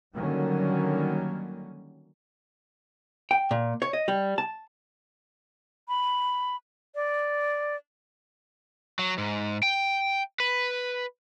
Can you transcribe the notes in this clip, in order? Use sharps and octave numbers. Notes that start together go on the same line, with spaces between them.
D3 D#3 F#3 G3 A#3 C#4
G5
A#2
C#5
D#5
G3
A5
B5
D5
F#3
G#2
G5
B4